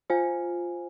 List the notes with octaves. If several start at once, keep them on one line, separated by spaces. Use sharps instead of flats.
F4 C5 F5 G#5